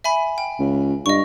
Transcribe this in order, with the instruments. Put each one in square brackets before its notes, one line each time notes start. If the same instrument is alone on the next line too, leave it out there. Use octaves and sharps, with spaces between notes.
[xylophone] E5 G#5 B5
G5
[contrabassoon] C#2
[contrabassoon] G2 [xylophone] D#5 C#6